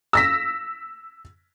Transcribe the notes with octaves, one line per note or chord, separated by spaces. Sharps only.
E6 A#6 B6